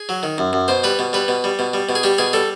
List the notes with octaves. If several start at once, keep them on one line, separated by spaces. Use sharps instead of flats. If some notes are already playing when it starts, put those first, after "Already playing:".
Already playing: G#4
F#3
D#3
F#2
F#2
B2 C5
G3 B4
B2
G3 B4
B2
G3
B2
G3
B2
G#4
G3 G4
B2 G#4
G3 A4